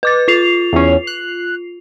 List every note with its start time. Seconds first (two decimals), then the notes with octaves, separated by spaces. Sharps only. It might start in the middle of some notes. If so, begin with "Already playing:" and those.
0.03 B4 D6 A6
0.28 F4 C7 F7
0.73 E2 C#4
1.07 F#6